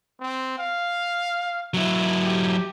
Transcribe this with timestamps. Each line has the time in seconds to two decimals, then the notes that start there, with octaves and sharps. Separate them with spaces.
0.20 C4
0.59 F5
1.74 F#3 E4
2.22 G4